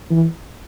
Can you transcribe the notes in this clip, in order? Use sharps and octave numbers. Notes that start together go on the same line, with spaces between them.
E3